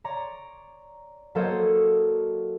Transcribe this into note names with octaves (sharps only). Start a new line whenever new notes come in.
C#5 D5 A#5 C6
F#3 A#3 A4 C5 C#5 D#5